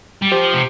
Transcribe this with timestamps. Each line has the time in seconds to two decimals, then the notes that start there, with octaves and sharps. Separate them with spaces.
0.22 G3
0.32 F3 G4 C5
0.54 C3